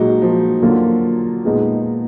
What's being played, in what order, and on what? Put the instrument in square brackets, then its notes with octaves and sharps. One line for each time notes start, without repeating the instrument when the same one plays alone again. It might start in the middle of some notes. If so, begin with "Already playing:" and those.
Already playing: [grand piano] A#2 G#3 D#4 [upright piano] F#3
[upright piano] F3
[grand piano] D3 F#3 A#3 F4
A#2 G#3 B3 D#4